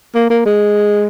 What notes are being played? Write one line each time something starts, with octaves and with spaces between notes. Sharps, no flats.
A#3
A#3
G#3